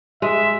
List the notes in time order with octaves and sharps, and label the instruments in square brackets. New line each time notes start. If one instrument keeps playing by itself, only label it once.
[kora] G#3 [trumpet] E5